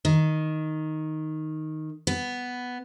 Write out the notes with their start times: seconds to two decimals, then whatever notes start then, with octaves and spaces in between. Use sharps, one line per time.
0.05 D#3
2.07 B3